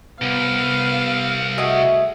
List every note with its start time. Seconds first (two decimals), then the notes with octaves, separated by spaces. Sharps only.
0.22 C2 B3 F5
1.58 A3 F#4 G#4 D#5